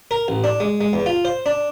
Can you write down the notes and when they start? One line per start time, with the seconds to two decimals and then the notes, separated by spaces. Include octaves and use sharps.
0.11 A#4
0.28 A1
0.44 D4
0.60 G#3
0.81 G#3
0.93 E2
1.06 F4
1.25 C5
1.46 D4